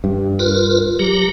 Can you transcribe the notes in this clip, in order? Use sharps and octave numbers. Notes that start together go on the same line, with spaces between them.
G2
F4 A#4 B4
F#3 G4 A#5